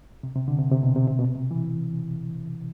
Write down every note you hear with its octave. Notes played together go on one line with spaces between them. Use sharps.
C3
C3
D3
C3
C3
B2
C3
C3
B2
C3
E3